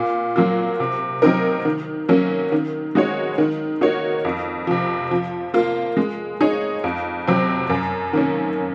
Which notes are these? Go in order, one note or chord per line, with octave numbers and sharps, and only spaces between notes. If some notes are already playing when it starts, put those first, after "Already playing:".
Already playing: A#2
F#3 A#3 F4
C3
F#3 C4 D#4 A#4
D#3
F#3 A#3 C#4
D#3
G#3 D#4 F#4 C#5
D#3
A#3 D#4 F#4 C#5
F2
C3 F3
F3
A#3 F4
G#3
D#4 G#4 C#5
F2
C3 F#3 C4
F#2
D#3 A#3 C#4